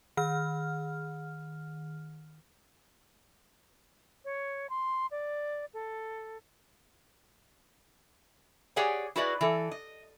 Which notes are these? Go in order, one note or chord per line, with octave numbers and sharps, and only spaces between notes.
D#3 F6
C#5
C6
D5
A4
G4 G#4 C#5 D5 F#5 G#5
E4 F#4 G#4 B4 D5 D#5
E3 A4
D#5